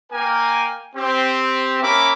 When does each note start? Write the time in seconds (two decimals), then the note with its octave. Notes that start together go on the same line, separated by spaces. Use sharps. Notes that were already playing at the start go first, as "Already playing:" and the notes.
0.13 A#3 A#4 G5 G#5
0.96 C4 G4
1.82 A#3 C#4 A#4 E5 B5 D6